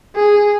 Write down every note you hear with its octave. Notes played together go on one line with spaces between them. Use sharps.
G#4